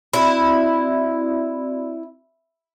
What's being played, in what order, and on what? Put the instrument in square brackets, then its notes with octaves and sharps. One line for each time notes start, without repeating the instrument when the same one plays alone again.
[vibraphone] C4 F#4 D5 [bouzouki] E4